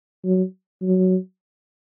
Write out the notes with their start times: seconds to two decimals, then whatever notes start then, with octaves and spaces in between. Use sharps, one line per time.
0.25 F#3
0.82 F#3